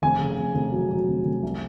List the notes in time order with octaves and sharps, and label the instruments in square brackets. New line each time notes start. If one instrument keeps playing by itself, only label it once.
[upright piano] F1 G#5
C#3
F1
F1
F#3
F#3
F1
F1
C2